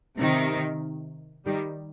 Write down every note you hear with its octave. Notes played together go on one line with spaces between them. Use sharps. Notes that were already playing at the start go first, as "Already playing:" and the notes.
C3 D#3
D#3 G3